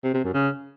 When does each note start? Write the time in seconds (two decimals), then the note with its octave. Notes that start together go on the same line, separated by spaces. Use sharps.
0.04 C3
0.14 C3
0.24 F#2
0.34 C#3